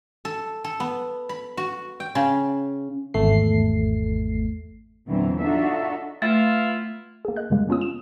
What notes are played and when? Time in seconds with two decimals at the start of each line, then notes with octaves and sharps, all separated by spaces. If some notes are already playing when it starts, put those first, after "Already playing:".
0.25 A4
0.64 A4
0.80 B3
1.29 B5
1.57 F#4
2.00 G5
2.15 C#3
3.14 G#1 E2 A3 C7
5.08 E2 A#2 D3 E3 F#3 C4
5.40 D4 D#4 F4 F#4 A4 E5
6.22 A3 B3 E4 F4
7.25 A#3 G#4
7.36 D#5 F#6
7.50 F#2 C#3 G3 G#3 A#3
7.69 B3 C#4 F4 D#6
7.81 E7